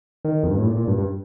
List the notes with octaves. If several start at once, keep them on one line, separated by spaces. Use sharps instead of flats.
D#3
F2
G2
A2
A#2
A#2
G2
G2